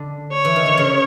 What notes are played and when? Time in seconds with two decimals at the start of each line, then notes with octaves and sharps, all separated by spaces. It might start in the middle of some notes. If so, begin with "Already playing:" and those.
Already playing: D3
0.32 C#5
0.45 E3
0.56 D#3
0.66 D3
0.77 C#3